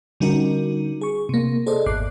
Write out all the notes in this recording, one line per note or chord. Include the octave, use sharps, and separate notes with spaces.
D3 G3 C#4 D#4 F#4 A#4
G#4 C#6
C3 A#3
G#4 A4 C5 D5 D#5
G#1 E2 D6 F#6 C7